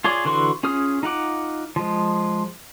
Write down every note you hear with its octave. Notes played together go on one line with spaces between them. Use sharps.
F4 G#4 C#5 D5
D3 E3 F#4 C6 C#6
C#4 F4 G#4 D#6 F6
D#4 F4 F#5 D6
F3 G#3